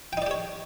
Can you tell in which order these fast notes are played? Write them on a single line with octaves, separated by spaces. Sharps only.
G5 D#4 D5 G4 C#5